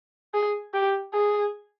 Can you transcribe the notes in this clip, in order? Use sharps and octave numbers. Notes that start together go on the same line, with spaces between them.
G#4
G4
G#4